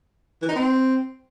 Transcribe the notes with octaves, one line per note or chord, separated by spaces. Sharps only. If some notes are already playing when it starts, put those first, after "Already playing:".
E3
D#4
C4